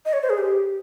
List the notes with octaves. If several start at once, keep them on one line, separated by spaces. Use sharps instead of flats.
D#5
C#5
C5
G#4
G4